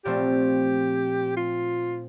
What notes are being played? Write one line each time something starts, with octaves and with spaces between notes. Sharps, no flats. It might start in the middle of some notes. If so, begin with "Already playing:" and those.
A#2 F3 A3 C4 G4
F4